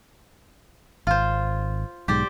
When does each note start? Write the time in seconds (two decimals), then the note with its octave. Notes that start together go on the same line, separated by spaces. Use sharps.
1.07 G#1 F4 C5
2.08 B1 G#2 G4 C5 D5